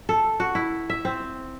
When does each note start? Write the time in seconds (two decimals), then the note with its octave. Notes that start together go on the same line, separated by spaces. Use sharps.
0.09 A4
0.40 F#4
0.55 E4
0.90 E5
1.05 C4